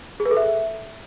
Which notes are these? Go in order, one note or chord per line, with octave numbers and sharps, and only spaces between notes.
G#4
B4
A4
E5